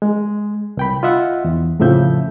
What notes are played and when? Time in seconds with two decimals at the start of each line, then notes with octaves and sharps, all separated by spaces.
0.02 G#3
0.77 C2 G5 B5
1.03 F4 D#5 E5 F#5
1.45 E2
1.79 F2 A2 C#3 F3 E5 G6